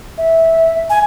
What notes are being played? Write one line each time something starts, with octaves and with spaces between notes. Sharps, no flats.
E5
G#5